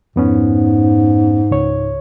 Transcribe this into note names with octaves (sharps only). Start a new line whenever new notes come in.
F2 G#2 B3 C#4
C#2 C#5